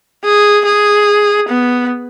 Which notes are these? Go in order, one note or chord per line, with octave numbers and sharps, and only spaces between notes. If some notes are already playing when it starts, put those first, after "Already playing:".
G#4
G#4
B3